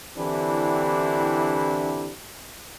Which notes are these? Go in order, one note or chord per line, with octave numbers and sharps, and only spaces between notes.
D3 E3 C4 D4 E4 G4